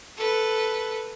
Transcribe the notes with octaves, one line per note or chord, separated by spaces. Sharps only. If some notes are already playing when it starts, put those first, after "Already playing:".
A4 B4